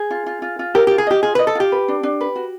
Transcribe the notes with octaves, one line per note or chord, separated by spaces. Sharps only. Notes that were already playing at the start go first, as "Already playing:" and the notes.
Already playing: G#4
F4
F4
F4
F4
G4 A#4
F4 G4
G#4
G4 D#5
F4 G#4
B4 D#5
A4
F4 G4
B4
D4
D4
B4
F#4